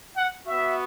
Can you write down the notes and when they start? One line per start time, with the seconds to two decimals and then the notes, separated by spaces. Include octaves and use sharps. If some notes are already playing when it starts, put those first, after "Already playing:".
0.17 F#5
0.47 B3 F#4 E5